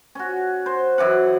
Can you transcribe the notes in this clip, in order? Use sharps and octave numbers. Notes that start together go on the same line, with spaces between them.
C#4 F#4
C5
F#2 E3 F#5